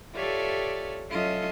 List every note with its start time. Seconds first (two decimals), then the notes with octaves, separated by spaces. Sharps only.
0.16 F4 G4 A4 C#5 D5 E5
1.10 F#3 C#4 F4 A4 D#5 E5